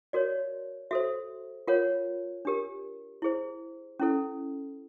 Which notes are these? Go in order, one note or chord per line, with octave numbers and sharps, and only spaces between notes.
F#4 A#4 C#5 D5
F#4 A4 C5 E5
F4 A#4 C#5 F#5
D4 G4 A#4
E4 G#4 C5
C#4 E4 A4